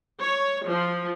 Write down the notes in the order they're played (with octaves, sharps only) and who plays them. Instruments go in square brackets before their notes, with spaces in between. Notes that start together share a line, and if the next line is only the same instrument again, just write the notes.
[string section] C#5
F3